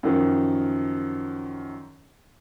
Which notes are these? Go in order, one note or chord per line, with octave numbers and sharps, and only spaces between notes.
F#2 D#3 F3